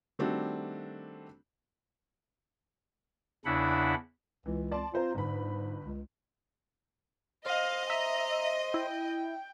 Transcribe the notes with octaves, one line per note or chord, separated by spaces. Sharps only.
D#3 G3 A3 C4 D4 F#4
E2 C#3 D4 E4 F#5 B5
C#2 E3
D5 A5 C6
C4 F4 C5 A#5
G1 G#2 B5
C#2
C5 D#5 F5
E5 A#5
E4 G5